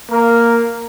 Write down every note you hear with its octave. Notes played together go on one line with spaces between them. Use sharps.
A#3 A#4